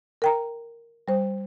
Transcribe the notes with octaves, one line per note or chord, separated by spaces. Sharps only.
A#4 G5 A#5
G3 C5